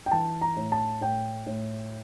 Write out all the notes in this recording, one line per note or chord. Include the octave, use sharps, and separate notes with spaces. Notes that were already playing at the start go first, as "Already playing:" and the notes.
G5
E3 A5
A#5
A2
A5
A2 G5
A2